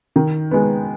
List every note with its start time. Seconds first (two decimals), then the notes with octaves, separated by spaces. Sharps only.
0.16 D#3
0.51 G#3 B3